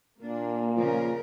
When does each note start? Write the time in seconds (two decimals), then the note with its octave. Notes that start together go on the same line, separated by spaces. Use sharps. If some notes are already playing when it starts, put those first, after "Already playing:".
0.22 A#2 A#3 D4
0.77 C#3 F3 A#4